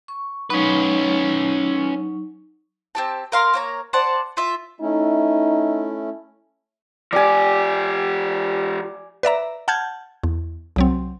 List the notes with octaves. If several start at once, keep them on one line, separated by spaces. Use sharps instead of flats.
C#6
F#3 C#4 D#4 B4 C#6
C4 G4 A5
A#4 F5 C6
A#3 C#5 A#5
C5 D5 F#5 A5
F4 E5
A3 C#4 D#4 E4
F3 G4 D5 G#5
B4 D5 E5 A#5
F#5 A5 F6 G6 G#6
E2
C2 F#3 C4